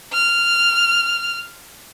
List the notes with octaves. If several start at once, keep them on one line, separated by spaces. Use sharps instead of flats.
F6